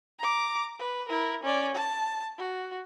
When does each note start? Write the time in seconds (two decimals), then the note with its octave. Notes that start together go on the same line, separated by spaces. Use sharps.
0.19 A#5 D6
0.79 B4
1.09 E4 A#4
1.44 C#4 D5
1.75 A5
2.38 F#4